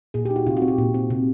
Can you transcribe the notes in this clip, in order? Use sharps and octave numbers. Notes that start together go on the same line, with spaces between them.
A#2 G#4
D#4 G4
F#4
C3 F4
F#4
C4
G4
A#2
C4
C3